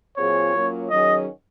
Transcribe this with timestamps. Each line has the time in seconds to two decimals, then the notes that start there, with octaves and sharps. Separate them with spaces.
0.17 A#2 F#3 C4 F4 G#4 C#5
0.54 F#3 A#3 C#4 F4
0.90 D#3 F#3 C#4 G#4 D#5